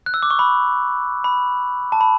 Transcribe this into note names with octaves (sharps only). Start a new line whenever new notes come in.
F#6
E6
D6
C#6
B5
B5
A5
B5